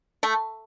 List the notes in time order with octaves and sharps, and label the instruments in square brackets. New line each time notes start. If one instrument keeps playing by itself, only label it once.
[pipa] A3